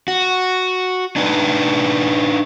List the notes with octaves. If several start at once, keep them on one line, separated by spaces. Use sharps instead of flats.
F#4
D4 D#4 B4